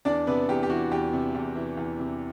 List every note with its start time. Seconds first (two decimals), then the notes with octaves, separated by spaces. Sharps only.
0.05 E2 D4 D5
0.27 C3 B3 B4
0.49 E2 G4
0.63 G4
0.70 E3 F#4
0.91 E2 G4
1.13 C3
1.34 E2
1.55 E3
1.77 E2
1.99 C3